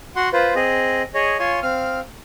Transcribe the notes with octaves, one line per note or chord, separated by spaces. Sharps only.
F#4 F#5 C6
F4 B4 C5
C4 G#4 D#5
G#4 C#5 D#5
F4 C#5 G#5 C6
C4 F5 F6